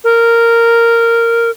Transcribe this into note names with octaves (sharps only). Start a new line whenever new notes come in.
A#4